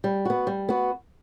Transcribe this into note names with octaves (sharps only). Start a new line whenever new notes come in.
G3
B3 F#4
G3
B3 F#4